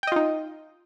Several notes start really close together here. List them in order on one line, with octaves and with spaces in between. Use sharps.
G5 D#5 F4 D#4